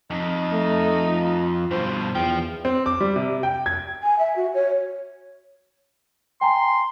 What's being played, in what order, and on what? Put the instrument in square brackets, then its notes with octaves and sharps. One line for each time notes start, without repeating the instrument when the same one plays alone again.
[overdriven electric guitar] F2 [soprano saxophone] D#4
[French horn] A3
F4
[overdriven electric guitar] G2 B2 [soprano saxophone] C5
[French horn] E2 [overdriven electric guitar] F3 [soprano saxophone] G5
[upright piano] C4
D6
G3
C3
G5
G#6
[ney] G#5
E5
F#4
C#5
[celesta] G5 G#5 A#5 [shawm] C6